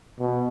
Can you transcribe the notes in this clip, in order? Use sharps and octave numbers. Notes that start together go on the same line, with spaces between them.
B2